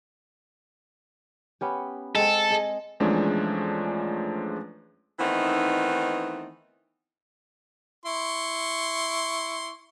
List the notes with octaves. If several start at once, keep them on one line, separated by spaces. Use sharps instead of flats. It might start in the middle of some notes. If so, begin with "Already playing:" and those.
B3 C#4 G4
G#3 C4 A4
G#4 D#5
E2 F3 G#3 A3 C#4 D4
D#3 E3 A3 B3 C4 D#4
E4 C6 C#6